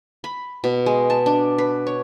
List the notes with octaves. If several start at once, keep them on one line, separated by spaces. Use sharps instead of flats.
B5
B2
G#3
A5
D4
B4
C#5